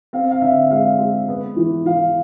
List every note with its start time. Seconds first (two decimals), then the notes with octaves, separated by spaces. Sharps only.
0.13 C4 F5
0.31 F5
0.41 D3 E5
0.71 G#3 F5
0.99 G#3
1.28 B3
1.56 E3
1.85 E3 F5